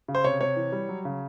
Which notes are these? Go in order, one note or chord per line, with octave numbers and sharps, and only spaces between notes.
C#3
C5
C3 C#5
C3 C#5
E3
G3
F#3
C#3